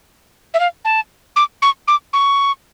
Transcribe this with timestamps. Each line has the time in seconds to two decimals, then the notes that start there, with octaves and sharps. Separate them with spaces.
0.54 E5
0.60 F5
0.85 A5
1.36 D6
1.62 C#6
1.88 D6
2.13 C#6